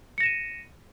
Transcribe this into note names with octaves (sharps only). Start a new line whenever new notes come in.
A#6 C#7 D#7 E7